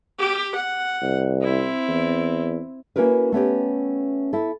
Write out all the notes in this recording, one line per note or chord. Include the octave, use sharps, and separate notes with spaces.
G4
F#5
C2
C4 E4
E2
A#3 C#4 E4 F#4 A#4 B4
A3 B3 C#4 G4
E4 A4